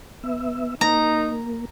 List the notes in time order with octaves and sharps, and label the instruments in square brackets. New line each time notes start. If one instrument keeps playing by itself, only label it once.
[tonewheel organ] B3 E5
[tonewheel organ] A#3 [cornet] D#4 [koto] A#5